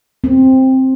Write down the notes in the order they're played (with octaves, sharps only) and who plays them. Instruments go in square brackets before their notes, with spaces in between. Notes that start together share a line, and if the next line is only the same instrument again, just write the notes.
[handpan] C4